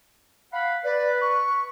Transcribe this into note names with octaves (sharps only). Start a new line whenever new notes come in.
F5 F#5 B5
B4 D5
C#6